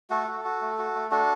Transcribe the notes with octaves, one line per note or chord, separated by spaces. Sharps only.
A3 F#4 A4
F#4
F#4
A3
F#4
A3
D4 F#4 A4